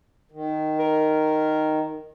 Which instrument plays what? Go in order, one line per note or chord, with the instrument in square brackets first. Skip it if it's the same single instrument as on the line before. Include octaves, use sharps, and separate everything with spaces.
[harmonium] D#3
[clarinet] A#4